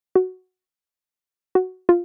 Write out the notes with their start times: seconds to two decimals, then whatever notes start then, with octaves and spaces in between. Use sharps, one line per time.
0.15 F#4
1.55 F#4
1.89 F4